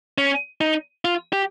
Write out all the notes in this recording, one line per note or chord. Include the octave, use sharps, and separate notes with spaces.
C#4
D#4
F4
G4